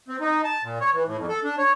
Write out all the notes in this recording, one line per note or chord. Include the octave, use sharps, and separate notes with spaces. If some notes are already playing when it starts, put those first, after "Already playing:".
C4
D#4
A5
A#2
C#5
E3
A2
F2
A4
D4
C#5